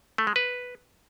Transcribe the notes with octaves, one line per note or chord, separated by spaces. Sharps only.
A3
G#3
B4